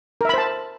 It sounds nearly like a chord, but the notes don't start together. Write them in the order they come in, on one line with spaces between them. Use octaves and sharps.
A#4 E5 B5 C5 A5